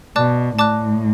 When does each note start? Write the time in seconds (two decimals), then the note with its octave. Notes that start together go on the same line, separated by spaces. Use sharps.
0.16 B2 D5 A5 D6 F#6
0.58 A2 D5 A5 D6 F#6